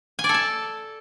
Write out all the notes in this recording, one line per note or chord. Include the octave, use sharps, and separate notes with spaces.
G#5
D5
A4
A5